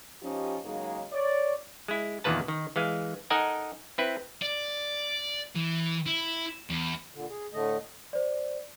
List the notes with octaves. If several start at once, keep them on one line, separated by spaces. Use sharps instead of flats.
F3 C#4 D#4 G4
C#3 F#3 G#3 A#3 D#4 G#4
C#5 D5
G#3 E4
E2 A#2 D#3 A#3 B4 A5
D#3
E3 G#3 F5
D#4 A4 A#4 D#5 F#5 G#5
C4 E4 B4
D5
E3
E4
E2
A#2 D3
G#4
A2 D3 A3 D#5
C5 D5